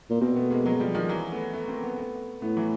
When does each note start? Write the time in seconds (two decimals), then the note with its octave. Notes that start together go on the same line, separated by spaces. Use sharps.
0.10 A#2
0.21 B2 A#3 C4
0.36 A3 B3
0.50 G#3 A#3
0.66 F#3 G#3
0.80 F3 G3
0.94 D#3 F3
1.09 E3 F#3
1.32 A3 B3
1.53 A3 B3
1.68 A#3 C4
1.84 A3 B3
1.98 A3 B3
2.42 A2 A3 B3
2.57 E3 F#3